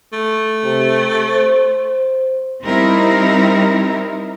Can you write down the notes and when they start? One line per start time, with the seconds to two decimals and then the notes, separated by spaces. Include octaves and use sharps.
0.13 A3
0.63 C3
1.26 C5
2.65 G3 C4 D#4 E4 A#4